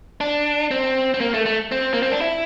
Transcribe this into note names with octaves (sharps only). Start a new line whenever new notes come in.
D4
C4
C4
A#3
A3
A3
C4
A#3
C4
D4
E4